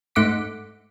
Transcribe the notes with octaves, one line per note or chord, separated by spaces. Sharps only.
G#2 A3 F#5 D6 B6